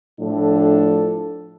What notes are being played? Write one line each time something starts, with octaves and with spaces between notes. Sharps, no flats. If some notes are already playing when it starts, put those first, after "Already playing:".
A2 F3 D4 A4